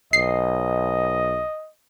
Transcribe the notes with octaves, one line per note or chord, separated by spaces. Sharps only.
B1 D#5 C7